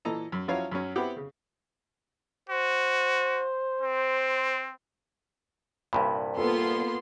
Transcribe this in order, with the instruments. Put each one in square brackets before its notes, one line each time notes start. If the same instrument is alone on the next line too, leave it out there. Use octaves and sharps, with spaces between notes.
[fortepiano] A#2 E3 A4 D#5 A#5
F#2
F3 F#3 C#4 E4 C#5 F5
F#2 F#3 C#4
B3 C4 E4 G4 F#5
C#3
[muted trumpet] F#4 [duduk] C5
[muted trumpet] C4
[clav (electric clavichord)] C2 G2 A#2 [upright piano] B5
[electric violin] A#3 F4 [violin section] B3 C6 [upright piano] A4